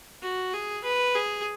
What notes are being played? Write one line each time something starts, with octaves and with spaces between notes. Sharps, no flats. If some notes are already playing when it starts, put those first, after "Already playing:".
F#4
G#4
B4
G#4